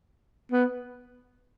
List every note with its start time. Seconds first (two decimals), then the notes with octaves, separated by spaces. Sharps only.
0.52 B3